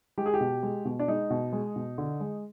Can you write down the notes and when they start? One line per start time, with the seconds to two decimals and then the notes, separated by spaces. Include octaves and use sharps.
0.18 G#3 G4
0.26 G#4
0.34 G4
0.41 B2
0.63 G#3
0.85 B2
0.99 D4
1.08 G#3 D#4
1.30 B2
1.53 G#3
1.76 B2
1.98 D3
2.20 G#3